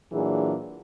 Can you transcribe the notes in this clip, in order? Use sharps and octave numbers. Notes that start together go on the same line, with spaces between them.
A#2 E3 F#3 D4 G#4